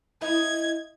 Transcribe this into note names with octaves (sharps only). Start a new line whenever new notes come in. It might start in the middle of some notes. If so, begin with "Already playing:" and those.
D#4 E4 D#5 G#6